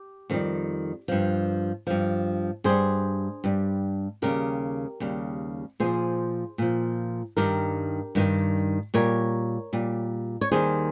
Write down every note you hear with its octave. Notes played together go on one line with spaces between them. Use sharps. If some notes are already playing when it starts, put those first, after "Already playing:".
Already playing: G4
F2 D#3 G3
G2 F3
G2 F3
G2 G3 G#4 C5
G2 G3
D#2 C#3 G3 G4 A#4
D#2 C#3 G3
A#2 F3 G#4 C5
A#2 F3
G2 D#3 G3 G4 A#4
G2 D#3 G3
A#2 G3 A#4 C#5
A#2 G3
C#5
D#2 D#3 G3 G#4 C5